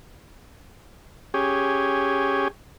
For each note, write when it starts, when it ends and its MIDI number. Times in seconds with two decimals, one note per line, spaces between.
1.34 2.48 61
1.34 2.48 67
1.34 2.48 68